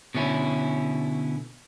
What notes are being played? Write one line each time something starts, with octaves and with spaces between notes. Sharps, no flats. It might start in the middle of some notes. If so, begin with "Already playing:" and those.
B2 D3 C#4 E4